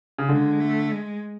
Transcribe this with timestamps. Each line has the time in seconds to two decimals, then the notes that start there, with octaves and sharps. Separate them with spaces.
0.18 C#3
0.29 D3 G#3
0.60 A3
0.91 G#3